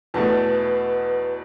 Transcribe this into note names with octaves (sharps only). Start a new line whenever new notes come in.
E2 B2 A3 B4